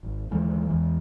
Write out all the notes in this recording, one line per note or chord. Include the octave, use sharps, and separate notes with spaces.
G#1
D#2 D3 E3 G#3
E2 E3 G#3